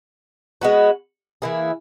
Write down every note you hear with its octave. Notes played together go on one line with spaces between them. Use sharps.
G#3 B3 F#4
E3 A#3 E4 G#4